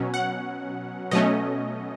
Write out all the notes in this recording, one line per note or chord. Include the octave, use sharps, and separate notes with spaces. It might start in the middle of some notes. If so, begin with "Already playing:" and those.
Already playing: B2 F#3 C#4
F#5
B2 F#3 A3 C#4 D#5